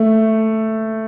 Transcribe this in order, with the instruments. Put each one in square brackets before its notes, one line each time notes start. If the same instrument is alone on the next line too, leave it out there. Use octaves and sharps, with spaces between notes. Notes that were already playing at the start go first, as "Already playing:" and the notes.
Already playing: [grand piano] A3